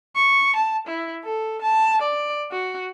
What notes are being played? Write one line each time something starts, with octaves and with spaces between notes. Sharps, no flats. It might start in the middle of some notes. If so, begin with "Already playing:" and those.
C#6
A5
E4
A4
A5
D5
F#4